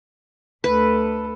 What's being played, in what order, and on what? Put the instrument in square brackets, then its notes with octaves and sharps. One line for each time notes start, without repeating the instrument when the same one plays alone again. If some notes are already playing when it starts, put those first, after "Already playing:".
[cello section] D2 A4 [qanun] B4